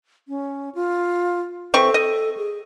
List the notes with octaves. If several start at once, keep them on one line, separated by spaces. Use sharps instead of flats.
C#4
F4
E3 C4 A4 C#6
D#5
G#4